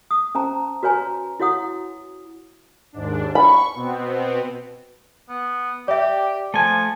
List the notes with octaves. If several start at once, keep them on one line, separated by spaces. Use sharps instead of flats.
D#6
C#4 C5 A5 A#5
F#4 B4 C#5 G#5 A#5
E4 F#4 C#5 F#5 D#6
D#2 G#2 D4
B5 C#6
B2 B3 C4
B3
G4 D5 E5
F3 A3 G#5 A5